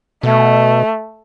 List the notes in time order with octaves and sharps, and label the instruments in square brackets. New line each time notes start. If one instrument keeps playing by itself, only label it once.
[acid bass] B2 [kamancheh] A3